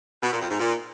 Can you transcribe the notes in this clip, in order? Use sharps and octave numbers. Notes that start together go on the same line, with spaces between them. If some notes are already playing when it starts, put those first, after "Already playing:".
B2
A#2
F2
G#2
A#2